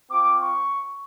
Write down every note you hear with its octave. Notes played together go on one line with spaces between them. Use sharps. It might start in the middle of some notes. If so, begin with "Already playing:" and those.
C4 F4 D6
C#6